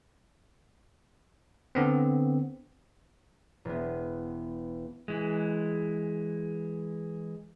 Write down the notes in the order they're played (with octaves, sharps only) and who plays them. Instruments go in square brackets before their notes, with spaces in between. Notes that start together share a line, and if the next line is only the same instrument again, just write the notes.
[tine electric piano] D3 B3 C4
[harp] E1 B3
[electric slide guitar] E3 G#3